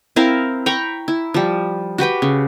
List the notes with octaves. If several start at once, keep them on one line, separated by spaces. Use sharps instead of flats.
C4 E4 A#4 F5
G5 A#5 B5 C#6
E4
F3 G3
F#4 G4 B4 G5
C#3